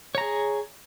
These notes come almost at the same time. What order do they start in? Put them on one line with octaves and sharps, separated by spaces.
C#5 A#5 G#4